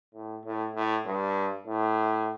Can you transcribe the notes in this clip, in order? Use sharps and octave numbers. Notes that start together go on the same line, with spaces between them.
A2
A2
A2
G2
A2